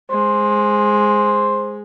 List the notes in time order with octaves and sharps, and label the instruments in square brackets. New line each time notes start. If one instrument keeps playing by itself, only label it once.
[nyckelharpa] G#3 [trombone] C5